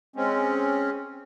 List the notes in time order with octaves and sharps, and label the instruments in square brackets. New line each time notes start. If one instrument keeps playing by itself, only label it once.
[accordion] G#3 C4 C#4